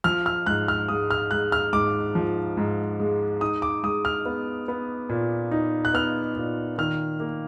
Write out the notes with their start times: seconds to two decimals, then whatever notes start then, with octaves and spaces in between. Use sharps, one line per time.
0.04 F3 F6
0.26 F6
0.46 G#2 F#6
0.68 F6
0.88 G#3 D#6
1.11 F6
1.31 G#3 F#6
1.52 F6
1.73 G#2 D6
2.15 F3
2.57 G#2
3.00 G#3
3.41 D#4 D#6
3.62 D6
3.83 G#3 D#6
4.05 F6
4.26 B3
4.68 B3
5.09 A#2
5.51 D#4
5.85 F#6
5.94 B3 F6
6.36 A#2
6.78 D#3 F6
7.20 A#3